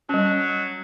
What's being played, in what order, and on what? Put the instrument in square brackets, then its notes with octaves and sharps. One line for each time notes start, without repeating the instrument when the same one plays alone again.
[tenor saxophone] F#3 [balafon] G3 C#4